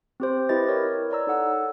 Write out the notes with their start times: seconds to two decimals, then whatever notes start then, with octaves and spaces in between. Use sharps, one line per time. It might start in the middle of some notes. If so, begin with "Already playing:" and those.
0.20 C4 G4 C5
0.49 E4 G4 B4 D#5 G5 A6
0.68 A#4 C#5
1.10 C#5 D5 A#5 E6
1.27 D#4 A4 F#5 E6